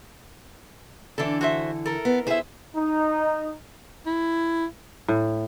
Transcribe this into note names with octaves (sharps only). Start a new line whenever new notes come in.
D3 E3 D4 A4
F#4 C5 E5
A4 A#4
B3
E4 G#4 C5 E5
D#4
E4
A2